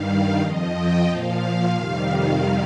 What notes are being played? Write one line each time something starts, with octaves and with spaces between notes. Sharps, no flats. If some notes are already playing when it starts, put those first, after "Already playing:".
Already playing: G2 D#3 G3 F5
F2 F3 D#5
G5
A#2 F3 F5
F2 C3 D#3 G3 F5